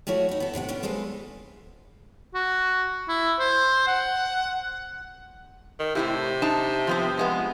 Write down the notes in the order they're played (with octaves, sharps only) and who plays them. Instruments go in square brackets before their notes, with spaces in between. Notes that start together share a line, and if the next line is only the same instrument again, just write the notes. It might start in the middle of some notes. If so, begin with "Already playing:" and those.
[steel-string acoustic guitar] F3 A3 E4 F#4 C#5
D#4 E4
B3 A4
A2 C3 E5 F#5
B3 C#4 D4
F3 G#3 C4 A4 B4 C5
[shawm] F#4
E4
C5
F#5
[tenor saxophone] D#3
[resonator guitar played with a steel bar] A2 E4 G4 [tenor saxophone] C3
[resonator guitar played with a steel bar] D4 D#4 A5
F3 B3 C4
F3 G#3 B3